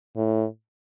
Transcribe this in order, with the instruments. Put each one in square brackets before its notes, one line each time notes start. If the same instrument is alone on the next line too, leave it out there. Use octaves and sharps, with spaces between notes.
[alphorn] A2